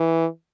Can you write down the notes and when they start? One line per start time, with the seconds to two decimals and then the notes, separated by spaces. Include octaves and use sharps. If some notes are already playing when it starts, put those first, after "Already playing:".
Already playing: E3